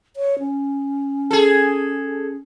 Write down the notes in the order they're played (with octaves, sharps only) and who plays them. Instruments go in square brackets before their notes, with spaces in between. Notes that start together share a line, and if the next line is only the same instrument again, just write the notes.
[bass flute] C#5
C#4
[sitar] G#4 A4